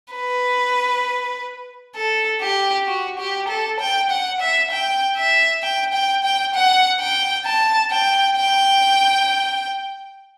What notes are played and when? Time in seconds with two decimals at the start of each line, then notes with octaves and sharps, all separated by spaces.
0.14 B4
1.96 A4
2.42 G4
2.87 F#4
3.19 G4
3.48 A4
3.80 G5
4.10 F#5
4.40 E5
4.71 G5
5.17 E5
5.63 G5
5.93 G5
6.24 G5
6.54 F#5
7.00 G5
7.45 A5
7.91 G5
8.37 G5